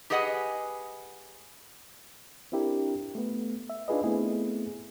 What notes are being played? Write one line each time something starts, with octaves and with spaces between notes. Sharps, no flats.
G4 G#4 B4 D#5 F#5 G#5
C4 D4 E4 G4 A#4
A3 B3
E5
D4 D#4 F4 G#4 B4 D#5
A3 B3 C4 E4 G#4